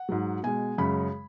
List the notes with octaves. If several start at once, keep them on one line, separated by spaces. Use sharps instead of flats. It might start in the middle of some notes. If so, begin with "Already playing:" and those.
Already playing: F#5
G#2 F#3
B2 G#3 G#5
F#2 C#3 G#3 B5